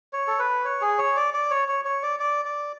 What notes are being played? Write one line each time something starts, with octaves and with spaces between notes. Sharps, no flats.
C#5
A4
B4
C#5
G#4
C#5
D5
D5
C#5
C#5
C#5
D5
D5
D5